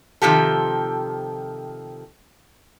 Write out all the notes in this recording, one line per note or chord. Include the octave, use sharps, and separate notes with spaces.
C3 D#3 F3 G4 A4